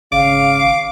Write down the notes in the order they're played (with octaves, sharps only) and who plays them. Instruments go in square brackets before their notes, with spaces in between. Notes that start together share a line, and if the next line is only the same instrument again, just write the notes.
[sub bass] G#1 [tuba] C#3 [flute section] F5 [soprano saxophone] D6